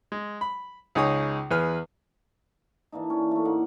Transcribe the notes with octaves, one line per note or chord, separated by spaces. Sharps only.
G#3
B5
C#2 D#4 G#4 C#5 D#6
E2 G#4 B4 F6
E3 A#3 D4 D#4
C#4
A3 A#3
A2 A#3 D#4 F#5